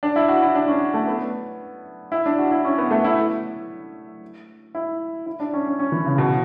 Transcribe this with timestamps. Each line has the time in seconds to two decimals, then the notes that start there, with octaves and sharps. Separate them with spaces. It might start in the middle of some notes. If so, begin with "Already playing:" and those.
0.03 D4
0.16 E4
0.29 F#4
0.42 E4
0.55 D4
0.68 C#4
0.94 A3
1.07 B3
2.12 E4
2.26 D4
2.38 F#4
2.51 E4
2.65 C#4
2.78 B3
2.91 A3
3.04 E4
4.75 E4
5.26 E4
5.40 D4
5.53 C#4
5.67 C#4
5.79 C#4
5.92 E3
6.06 C#3
6.18 B2